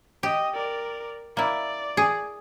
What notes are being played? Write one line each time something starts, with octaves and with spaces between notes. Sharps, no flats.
G4 D#5
A#4 D5
A#3 E4 D5
G#4